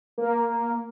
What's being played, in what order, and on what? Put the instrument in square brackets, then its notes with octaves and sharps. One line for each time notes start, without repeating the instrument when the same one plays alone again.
[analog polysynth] A#3